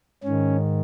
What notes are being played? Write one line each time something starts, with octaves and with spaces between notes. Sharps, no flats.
G#2 D#3 C#4